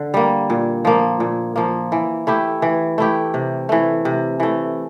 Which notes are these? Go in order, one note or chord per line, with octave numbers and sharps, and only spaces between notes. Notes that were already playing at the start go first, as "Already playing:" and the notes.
Already playing: D3
G3 A#3
A#2
F3 A#3
A#2
F3 A#3
E3
A3 E4 G4
E3
A3 E4 G4
C3
E3 A3
C3
E3 A3